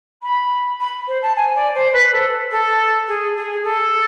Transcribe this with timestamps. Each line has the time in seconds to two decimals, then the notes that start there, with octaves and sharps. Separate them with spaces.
0.22 B5
0.80 B5
1.07 C5
1.22 A5
1.36 G#5
1.55 D5
1.74 C5
1.93 B4
2.12 A4
2.51 A4
3.07 G#4
3.36 G#4
3.64 A4